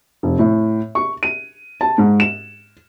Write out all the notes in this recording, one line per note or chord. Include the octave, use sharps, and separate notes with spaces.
F1
A2
C#6
D#7
A5
G#2
E7